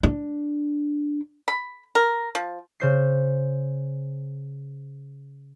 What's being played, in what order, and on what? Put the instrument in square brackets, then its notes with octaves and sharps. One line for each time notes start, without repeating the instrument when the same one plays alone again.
[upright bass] D4
[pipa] B5
A#4
F3
[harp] C#3 C5 C7